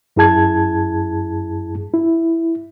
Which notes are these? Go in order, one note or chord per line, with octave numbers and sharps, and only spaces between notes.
F#2 E4 G#4 A5 G#6
E4